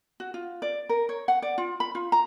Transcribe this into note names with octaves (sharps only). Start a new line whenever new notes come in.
F#4
F4
D5
A#4
C#5
F#5
D5
F4
B5
F4
A#5